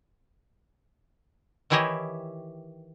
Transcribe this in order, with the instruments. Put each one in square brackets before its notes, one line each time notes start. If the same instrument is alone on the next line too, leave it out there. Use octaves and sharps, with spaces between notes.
[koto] D#3 E3 E4 G4 C#5 D#5